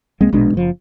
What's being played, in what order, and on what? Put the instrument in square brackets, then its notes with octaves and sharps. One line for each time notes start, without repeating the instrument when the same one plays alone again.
[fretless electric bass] C2 G#3 A#3 C4
A#1 B2 G#3 D4
F#1 F3